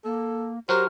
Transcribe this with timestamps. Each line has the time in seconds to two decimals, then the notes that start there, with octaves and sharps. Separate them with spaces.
0.05 A#3 A4
0.69 F#3 F#4 G4 A#4 C5 F6